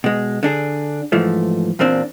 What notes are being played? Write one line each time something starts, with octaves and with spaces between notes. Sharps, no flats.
B2 G#3
D3 D4 G#4
G#2 E3 F3 A3
E2 A#2 A#3 C4 D4